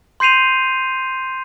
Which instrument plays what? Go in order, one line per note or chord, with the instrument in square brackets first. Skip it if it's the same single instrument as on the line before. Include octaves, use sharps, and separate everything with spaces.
[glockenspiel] C6 G6 C7 D#7 F7